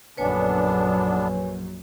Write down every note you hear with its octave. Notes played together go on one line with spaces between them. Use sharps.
A#1 F#2 D3 B3 D4 B4 C#5 G#5